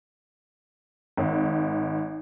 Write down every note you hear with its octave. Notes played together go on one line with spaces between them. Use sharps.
G#1